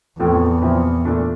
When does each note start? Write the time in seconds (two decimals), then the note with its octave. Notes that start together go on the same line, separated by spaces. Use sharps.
0.20 E2 A2 F3 A3 C4
0.62 A#2 F3 C4 E4
1.05 A#2 A3 D4 A4